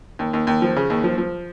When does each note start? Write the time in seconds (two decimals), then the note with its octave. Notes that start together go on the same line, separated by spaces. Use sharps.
0.19 D#2
0.33 D#2
0.47 D#2
0.62 F3
0.76 C#3
0.90 D#2
1.04 F3
1.18 F3